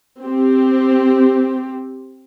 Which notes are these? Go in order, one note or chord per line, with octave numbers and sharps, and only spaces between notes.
C4 G4